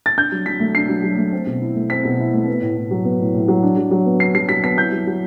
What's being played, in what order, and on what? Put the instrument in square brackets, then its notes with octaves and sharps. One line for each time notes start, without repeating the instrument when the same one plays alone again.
[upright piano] A6
D4 G6
F#3
F#3 B6
A3
D4 C7
F#3
F#3
A3
C4
B2
E4
A3
C4 B6
B2
E4
A3
B3
A2
A2
F#3
B3
A2
A2
F#3
D4
F#3
F#3
B3
D4 C7
F#3 C7
F#3 B6
B3 B6
E4 G6
F#3
F#3